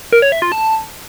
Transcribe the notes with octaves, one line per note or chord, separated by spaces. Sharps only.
A#4
C#5
E5
F4
A5